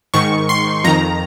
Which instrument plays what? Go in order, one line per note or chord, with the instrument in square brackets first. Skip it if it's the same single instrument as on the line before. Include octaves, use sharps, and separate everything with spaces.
[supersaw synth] G#2 D#3 C#6
C6
F2 D#3 A#5